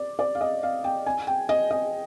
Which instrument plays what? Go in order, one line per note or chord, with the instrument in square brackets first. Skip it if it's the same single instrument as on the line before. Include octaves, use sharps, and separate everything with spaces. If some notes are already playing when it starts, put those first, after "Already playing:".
Already playing: [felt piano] D5
D5
F5
D#5
F5
G5
G#5
G5
D#5
D#5